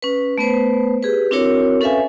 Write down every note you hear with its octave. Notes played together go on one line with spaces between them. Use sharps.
C#4 B4
A3 B3 B4 C5
G4 G#4 B4
C4 D4 E4 F#4 A#4 C#5
C#4 A4 B4 E5 F5 G#5